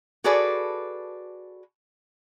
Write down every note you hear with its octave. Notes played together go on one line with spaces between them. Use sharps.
F#4 G#4 A4 B4 D5